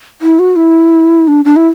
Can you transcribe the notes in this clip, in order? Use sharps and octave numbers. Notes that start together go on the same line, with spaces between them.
E4
F#4
E4
D4
D4
E4